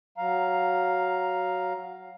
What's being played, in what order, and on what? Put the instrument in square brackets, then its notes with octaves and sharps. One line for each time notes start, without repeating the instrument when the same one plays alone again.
[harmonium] F#3 F5 A#5